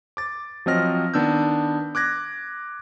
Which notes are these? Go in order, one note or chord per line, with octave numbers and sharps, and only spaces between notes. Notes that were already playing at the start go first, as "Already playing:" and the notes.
D6 A6
F3 F#3 C4 D#5 F6 A#6
D#3 B3 D4 E6 G6
D6 F#6 G#6 A#6